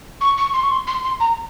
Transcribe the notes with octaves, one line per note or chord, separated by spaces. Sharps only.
C#6
C#6
C6
C#6
C6
C6
C6
A#5